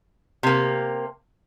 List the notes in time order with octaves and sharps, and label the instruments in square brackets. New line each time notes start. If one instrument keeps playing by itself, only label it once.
[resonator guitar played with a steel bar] C3 A#3